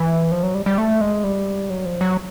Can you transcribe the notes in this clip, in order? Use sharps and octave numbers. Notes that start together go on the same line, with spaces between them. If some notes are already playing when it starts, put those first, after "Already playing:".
Already playing: E3
F3
F#3
G3
G3
A3
G#3
G3
F#3
F3
F#3